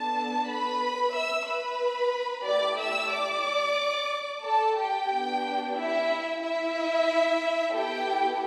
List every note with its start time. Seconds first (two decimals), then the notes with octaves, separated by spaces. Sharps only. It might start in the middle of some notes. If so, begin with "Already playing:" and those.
Already playing: B3 D4 A4 A5
0.50 B4 B5
1.16 E5 E6
1.49 B4 B5
2.47 A3 E4 G4 D5 D6
2.81 E5 E6
3.13 D5 D6
4.45 A4 A5
4.78 G4 G5
5.11 B3 D4 G4
5.77 E4 E5
6.42 E4 E5
7.74 B3 E4 G4 A4 G5